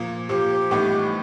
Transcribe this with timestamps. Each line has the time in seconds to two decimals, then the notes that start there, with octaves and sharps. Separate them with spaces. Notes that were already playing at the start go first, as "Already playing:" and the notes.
Already playing: A#2 F3 A#3
0.29 A#2 F3 A#3 G4
0.71 A2 E3 G3 B3 D#4